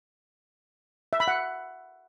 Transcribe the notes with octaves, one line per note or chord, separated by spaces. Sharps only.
E5
B5
F#5